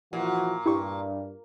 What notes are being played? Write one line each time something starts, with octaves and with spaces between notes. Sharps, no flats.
A#2 E3 F3 F#4
G2 E4 G4 C#6